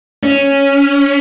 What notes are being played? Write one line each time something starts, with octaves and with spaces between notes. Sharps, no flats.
C#4